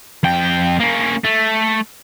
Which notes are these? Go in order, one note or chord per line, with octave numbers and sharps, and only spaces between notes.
F2 G5
A#3 C#4
A3